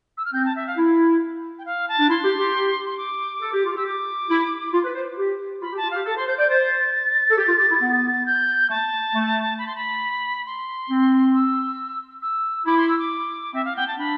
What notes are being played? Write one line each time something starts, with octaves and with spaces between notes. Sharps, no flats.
E6
F6
C4 G6
A5
E5
F5
E4
G5
F5
A5
D4
E4 C6
G4
G4
C6
D6
A4
G4
F4
G4 E6
D6
E4
F4
B4
C5
G4
F4 B5
G4
A5
F4
G4 F5
A4 A5
C5 C6
C5 G6
D5 G6
C5 A6
A4
G4
F4
G4
E4
B3
G6
A3 A5
A3
B5
C6
B5
C6
C4
E6
E6
E4 D6
C6
E6
D6
C4 E5
F5
B3 G5
A5
D4 B5